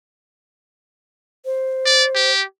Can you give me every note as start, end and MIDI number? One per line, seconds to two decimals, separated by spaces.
1.45 2.32 72
1.85 2.04 74
2.15 2.43 67